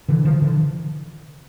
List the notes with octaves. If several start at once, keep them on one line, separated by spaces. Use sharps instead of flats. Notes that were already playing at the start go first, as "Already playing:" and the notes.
D3 E3
D#3 F3
D3 E3